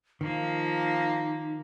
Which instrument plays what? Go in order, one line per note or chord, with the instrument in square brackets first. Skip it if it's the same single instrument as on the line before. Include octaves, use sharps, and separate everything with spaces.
[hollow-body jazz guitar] D#3 [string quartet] F3 A#3 [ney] D#4